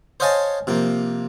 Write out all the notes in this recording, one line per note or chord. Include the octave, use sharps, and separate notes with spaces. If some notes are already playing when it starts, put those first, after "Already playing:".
C5 C#5 D#5 F5 G#5 A5
C3 F3 A#3